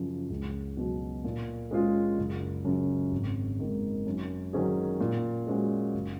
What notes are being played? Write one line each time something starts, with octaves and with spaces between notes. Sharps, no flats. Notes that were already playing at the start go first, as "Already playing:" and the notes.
Already playing: F#2 C#3 F3
C#2
B2 F#3
A#2
G#3 C#4 F4 G#4
F#1
F#2 C#3
G#1
G#2 D#3 A#3
F#2
D#3 F#3 C#4 G#4
A#2
G#3 C#4 F#4
F#1